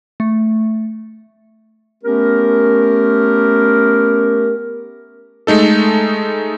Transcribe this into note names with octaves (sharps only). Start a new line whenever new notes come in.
A3
A3 B3 C#4 G4 A#4
G#3 A3 D#4 A4